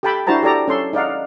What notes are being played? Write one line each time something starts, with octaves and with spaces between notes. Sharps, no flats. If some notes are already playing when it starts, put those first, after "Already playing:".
G4 A4 G5 A5 B5
D4 E4 F#4 C5 A5 A#5
G4 A4 D5 A#5
C#4 A4 C6
D#4 D5 F5 F#5